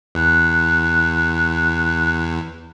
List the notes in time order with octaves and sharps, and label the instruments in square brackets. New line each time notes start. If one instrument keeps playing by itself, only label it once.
[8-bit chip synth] E2 [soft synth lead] F#6